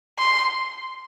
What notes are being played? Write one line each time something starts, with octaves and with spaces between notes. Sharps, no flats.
C6